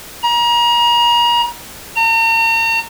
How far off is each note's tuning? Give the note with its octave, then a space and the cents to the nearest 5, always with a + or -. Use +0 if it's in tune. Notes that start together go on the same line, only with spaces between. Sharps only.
A#5 +35
A#5 -40